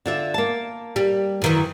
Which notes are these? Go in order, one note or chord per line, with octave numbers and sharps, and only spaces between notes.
D3 F4 E5
A#3 A5
G3
F#2 D#3 E3